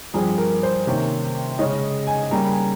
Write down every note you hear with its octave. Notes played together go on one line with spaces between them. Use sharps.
G2 F3 C4 G#4
A#4
C5
C3 D#3 A#3 C#4
C#3 G#3 C#4 D#5
G#5
C#3 G3 A#3 C#4 A#5
G#5